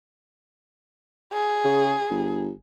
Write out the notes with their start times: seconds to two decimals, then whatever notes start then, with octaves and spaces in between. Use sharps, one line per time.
1.33 G#4
1.64 C#3
2.10 G1